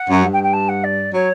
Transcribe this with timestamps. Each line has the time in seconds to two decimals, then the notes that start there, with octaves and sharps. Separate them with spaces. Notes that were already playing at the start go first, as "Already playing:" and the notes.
Already playing: F#5
0.08 F#2
0.23 G2
0.33 G5
0.43 G5
0.53 A5
0.68 F#5
0.83 D5
1.13 F#3 C#5